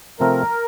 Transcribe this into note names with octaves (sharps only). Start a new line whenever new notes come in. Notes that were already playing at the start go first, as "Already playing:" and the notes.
C3 F3 A3 C4 A#4